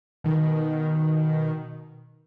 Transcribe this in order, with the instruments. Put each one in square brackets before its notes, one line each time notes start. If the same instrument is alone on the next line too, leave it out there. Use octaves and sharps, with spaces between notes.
[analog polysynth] B2 D#3